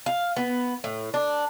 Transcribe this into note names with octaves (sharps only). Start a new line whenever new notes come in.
F5
B3
A2
D4